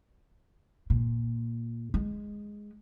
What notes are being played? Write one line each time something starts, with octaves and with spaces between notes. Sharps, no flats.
A#2
G#3